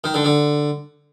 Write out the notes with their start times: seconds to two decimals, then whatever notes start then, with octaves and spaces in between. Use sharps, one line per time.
0.04 D#3
0.14 D3
0.25 D3